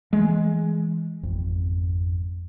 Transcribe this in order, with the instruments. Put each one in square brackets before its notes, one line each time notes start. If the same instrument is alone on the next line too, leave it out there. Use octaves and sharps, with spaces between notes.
[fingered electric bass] E3 [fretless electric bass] G#3
[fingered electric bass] G#1 F2